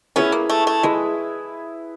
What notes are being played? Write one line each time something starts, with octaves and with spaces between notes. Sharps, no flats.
B3 C#4 E4 G#4 B4 E5
A#3
A3
A3
G#3 E4 G#4 B4 E5